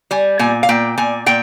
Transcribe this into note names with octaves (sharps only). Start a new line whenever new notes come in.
G3 G#5
A#2 G#5
F5
A#2 G5
A#2 G#5
A#2 G5